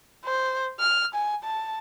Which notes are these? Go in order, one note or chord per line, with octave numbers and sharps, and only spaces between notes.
C5
F6
G#5
A5